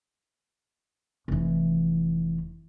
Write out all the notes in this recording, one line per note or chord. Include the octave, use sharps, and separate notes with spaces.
F1 E3